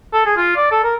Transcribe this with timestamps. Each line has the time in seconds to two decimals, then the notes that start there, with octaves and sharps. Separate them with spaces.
0.13 A4
0.26 G#4
0.37 F4
0.57 D5
0.72 A4
0.84 A#4